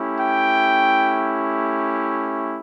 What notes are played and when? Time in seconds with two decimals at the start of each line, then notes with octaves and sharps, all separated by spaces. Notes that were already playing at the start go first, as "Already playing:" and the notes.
Already playing: A3 C#4 E4 G4
0.18 G5